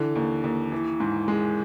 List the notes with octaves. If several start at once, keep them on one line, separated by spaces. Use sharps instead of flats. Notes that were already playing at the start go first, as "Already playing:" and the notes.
Already playing: D3 E3
D#2
D#2
E3
G#2
G#3